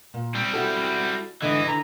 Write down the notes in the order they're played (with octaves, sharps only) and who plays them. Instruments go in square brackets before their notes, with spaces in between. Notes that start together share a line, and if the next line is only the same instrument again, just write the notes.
[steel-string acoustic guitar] A#2
[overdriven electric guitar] G3 C4
[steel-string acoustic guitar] E4 F#4 A4
[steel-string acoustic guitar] G#2 D3 E4 [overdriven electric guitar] E3 [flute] D#5
[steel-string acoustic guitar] D3 [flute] A#5